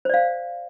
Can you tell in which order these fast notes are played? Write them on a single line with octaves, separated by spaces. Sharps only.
C5 D5 F5